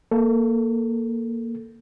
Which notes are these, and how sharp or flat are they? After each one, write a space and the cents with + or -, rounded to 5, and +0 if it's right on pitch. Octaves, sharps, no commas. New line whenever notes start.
A#3 +0 A4 +0